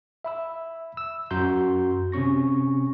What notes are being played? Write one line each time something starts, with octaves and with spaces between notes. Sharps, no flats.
E5 B5 E6
E6
F#2 F#4 A#5 C6 G6
C3 C4 C#4 C#6 A#6